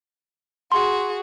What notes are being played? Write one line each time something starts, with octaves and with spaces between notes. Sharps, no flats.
F#4 G#4 C6